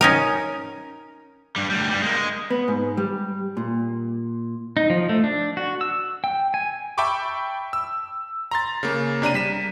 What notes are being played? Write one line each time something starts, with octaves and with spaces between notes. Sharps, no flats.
C#4 D#4 A#4
G2 G3
D2 G3
G2 G3
G#3 A#3
G#3
B3
G#2
G3
A#2
D#4
F3
A3
D4
F#4
E6
G5
G#5
E5 G5 A5 B5 C#6 D6
E6
A#5 C6 A6
C#3 A#3
C3 D4 A#5 D#7
G3 B6 E7